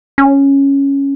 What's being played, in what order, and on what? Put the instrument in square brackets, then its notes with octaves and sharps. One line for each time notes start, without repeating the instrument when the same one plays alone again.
[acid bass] C#4